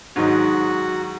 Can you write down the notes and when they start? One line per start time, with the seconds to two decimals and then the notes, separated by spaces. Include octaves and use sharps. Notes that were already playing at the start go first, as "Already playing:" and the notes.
0.16 G#2 D#3 F#3 D#4 F#4